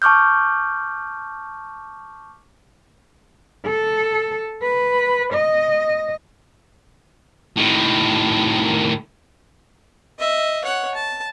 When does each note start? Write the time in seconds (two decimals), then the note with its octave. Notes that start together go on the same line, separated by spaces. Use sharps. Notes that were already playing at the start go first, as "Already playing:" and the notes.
0.02 A5 C#6 D6 F6 G6
3.67 A4
4.63 B4
5.34 D#5
7.57 A2 D#3
10.19 D#5 E5
10.64 C#5 F#5
10.95 A5